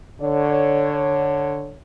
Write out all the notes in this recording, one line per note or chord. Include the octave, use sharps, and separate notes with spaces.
D3 C#5